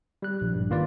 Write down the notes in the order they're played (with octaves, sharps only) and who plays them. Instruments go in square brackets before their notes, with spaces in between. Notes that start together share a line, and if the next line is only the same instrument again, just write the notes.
[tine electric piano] G3 F#6
A#1
G2
D#3 A#3 F4 B4 D5